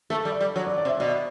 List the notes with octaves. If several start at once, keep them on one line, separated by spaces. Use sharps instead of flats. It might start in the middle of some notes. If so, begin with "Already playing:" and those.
A3 A4
G3
D5
G3
F#3
D5
D5
C3
E5
B2 D5